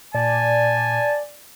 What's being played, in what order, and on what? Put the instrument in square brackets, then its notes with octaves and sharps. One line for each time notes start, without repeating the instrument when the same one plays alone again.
[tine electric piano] A#2 [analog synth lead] D5 [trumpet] G#5 [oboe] A5